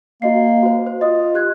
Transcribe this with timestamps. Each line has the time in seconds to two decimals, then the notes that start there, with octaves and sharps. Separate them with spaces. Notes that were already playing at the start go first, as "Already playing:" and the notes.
0.22 A#3 F#4 D#5 C7
0.63 F#4 C5
0.87 C5
1.01 F4 D#5 D#6
1.34 G4 F#6 G#6